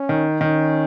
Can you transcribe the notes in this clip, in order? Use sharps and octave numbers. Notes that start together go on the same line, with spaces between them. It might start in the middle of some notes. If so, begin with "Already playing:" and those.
Already playing: C#4
D#3
D#3 C#4